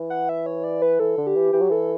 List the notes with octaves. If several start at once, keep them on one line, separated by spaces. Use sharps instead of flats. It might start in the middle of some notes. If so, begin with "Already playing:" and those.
Already playing: E3
F#5
E5
C#5
D5
B4
E3 A4
D3
G4
E3
E3 G4
F#3
E3 A4